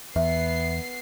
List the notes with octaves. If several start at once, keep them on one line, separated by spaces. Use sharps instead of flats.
E2 B3 E5 C7